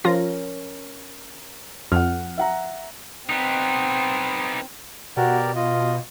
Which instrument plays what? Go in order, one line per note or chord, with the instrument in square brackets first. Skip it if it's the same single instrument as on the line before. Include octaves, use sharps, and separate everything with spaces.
[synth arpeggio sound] F3 F4 A#6 [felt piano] C#4 A#4
[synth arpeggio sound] F2 [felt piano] F#5 F6
[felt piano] E5 F#5 A#5
[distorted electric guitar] B3 D#4 [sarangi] C4
[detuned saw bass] B2 [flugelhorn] F#4 [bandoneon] G4 A#4 D5
[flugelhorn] F4 [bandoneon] D#5